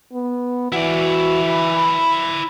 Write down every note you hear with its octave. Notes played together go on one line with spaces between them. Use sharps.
B3
E3 E4 F#4 D5
B5